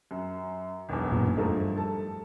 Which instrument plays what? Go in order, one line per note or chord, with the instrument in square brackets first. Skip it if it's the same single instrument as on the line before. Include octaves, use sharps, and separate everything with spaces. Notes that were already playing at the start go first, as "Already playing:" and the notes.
[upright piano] F#2
E1 B1 E2
[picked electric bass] F#2 A#2
[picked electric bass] G2 [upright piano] F3 A3 D#4
[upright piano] A4 A5